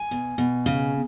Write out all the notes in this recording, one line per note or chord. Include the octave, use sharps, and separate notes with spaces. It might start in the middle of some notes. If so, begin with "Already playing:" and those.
Already playing: G#5
B2
B2
C#3